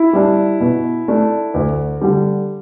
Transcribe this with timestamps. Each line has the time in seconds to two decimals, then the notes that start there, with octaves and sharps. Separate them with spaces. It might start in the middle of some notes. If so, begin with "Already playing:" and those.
Already playing: E4
0.13 G3 D4
0.60 B2
1.08 A3 D4
1.54 D2
2.01 D3 G3